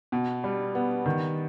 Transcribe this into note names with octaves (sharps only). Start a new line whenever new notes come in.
B2
G3
B3
D#3